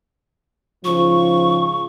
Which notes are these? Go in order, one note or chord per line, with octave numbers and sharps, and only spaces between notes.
G#2 C#3 F3 C#6